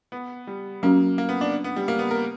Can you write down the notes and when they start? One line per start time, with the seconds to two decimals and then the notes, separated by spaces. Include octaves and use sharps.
0.12 B3
0.47 G3
0.83 F#3 A#3 C#4 F#4
1.18 A#3
1.29 B3
1.41 D4
1.64 B3
1.76 G3
1.88 A#3
1.99 B3
2.11 A#4